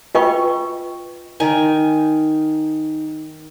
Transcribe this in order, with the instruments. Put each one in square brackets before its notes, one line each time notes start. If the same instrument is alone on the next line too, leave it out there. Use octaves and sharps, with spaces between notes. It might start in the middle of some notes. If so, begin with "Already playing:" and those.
[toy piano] F4 B4 D#5 G5 C#6
[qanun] D#3 D#4 G#5